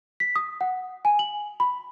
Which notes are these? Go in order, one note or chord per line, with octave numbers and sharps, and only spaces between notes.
B6
D#6
F#5
G#5
F#7
B5